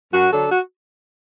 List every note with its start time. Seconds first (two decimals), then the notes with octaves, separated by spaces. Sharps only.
0.13 F#2 F#4
0.31 D3 F#3 D4 A4
0.50 F#4